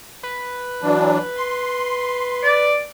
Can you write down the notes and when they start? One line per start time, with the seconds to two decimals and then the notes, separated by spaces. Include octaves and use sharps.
0.23 B4
0.82 E3 F#3 D4
1.37 C6
2.43 D5